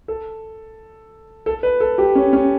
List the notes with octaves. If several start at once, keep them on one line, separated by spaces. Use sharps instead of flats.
A4
A4
B4
A4
G4
C#4
C#4